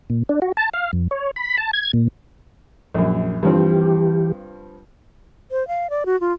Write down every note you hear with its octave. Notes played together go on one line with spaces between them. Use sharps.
A#2
D4
F#4
A5
F5
F2
C#5
B5
A5
G#6
A#2
A#1 F#2
G2 E3 F3 C4 G4
C5
F5
D5
F#4
F4